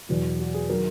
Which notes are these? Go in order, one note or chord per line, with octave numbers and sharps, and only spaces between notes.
E2 B2 F#3
F#4
G#4
D#3 F#3 A#4